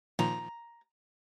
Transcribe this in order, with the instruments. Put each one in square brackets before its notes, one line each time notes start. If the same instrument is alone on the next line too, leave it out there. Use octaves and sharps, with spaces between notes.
[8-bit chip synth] A#2 D#3 F3 [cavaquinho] A#5